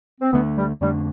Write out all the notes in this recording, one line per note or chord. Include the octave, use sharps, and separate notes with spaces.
C4
D2 D3 A3 B3 D4
G3
F2 D3 G3 A3 D4